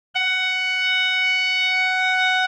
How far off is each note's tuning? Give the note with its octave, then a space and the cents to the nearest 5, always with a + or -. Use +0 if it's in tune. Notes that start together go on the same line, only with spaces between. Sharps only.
F#5 +10